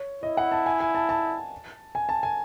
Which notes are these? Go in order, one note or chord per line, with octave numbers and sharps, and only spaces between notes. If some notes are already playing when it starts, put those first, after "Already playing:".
Already playing: C#5
E4 D#5
F#5
A5
G#5
G#5
A5
A5
G#5
A5
G#5